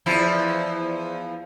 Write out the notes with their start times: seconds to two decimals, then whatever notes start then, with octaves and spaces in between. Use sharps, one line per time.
0.06 E2 F3 E4